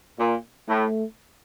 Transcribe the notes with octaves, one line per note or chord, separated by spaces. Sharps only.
A#2
A2 A3